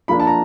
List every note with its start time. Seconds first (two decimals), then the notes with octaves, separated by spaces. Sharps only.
0.08 F3 A#3 D4 B5
0.20 A5
0.27 A#5